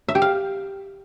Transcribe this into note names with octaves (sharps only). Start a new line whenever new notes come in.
E5
G4
F5